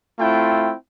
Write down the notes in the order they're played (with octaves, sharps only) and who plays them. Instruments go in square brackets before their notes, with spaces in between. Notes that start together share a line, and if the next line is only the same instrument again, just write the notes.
[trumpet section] A3 C4 E4 F4 G5